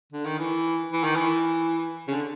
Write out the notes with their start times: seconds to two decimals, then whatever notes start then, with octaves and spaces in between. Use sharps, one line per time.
0.12 D3
0.25 D#3
0.39 E3
0.93 E3
1.04 D#3
1.15 E3
2.08 C#3
2.11 D3